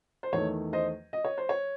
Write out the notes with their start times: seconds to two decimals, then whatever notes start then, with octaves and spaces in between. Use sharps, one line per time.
0.23 C5
0.32 E2 D#3 A3 C#5
0.73 C5 D#5
1.13 D#5
1.25 C#5
1.38 C5
1.49 C#5